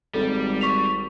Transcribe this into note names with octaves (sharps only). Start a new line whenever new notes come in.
G#1 G3 A4
C#6 B6 F7